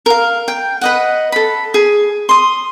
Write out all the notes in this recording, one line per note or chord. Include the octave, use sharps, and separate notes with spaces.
A#4 F5
G5
B4 D#5 F#5
A4 B5
G#4
C6 D#6